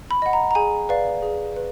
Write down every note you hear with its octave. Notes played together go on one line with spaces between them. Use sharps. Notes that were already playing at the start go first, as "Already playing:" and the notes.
B5
D#5 F#5
A#5
A#5
G#4 G#5
B4 D5 F5
G#4
B4